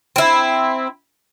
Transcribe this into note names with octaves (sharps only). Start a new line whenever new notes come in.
C4 E4